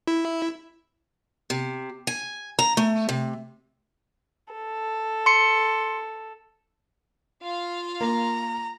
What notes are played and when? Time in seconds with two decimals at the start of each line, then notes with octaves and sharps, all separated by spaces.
0.07 E4
1.50 C3
2.07 G#5
2.59 A#5
2.77 A3
3.09 C3
4.55 A4
5.26 C6 C#7
7.43 F4 F5
8.01 A#3 A#5